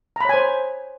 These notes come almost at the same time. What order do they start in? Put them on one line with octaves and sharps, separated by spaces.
A#5 B5 C#5 G#5 C5